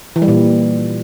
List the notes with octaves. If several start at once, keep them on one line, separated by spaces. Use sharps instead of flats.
E3
G3
A#2